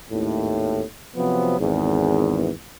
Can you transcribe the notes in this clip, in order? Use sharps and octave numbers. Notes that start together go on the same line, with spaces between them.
G#1 D#2 A2
C3 F3 F#3 B3
G#1 E2